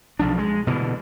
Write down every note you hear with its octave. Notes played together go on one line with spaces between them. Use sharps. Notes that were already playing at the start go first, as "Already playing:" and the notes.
B1 F3 D4
G#3
B2 D3 E3